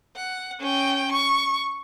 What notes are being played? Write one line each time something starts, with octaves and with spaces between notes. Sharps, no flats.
F#5
C#4 G5
C#6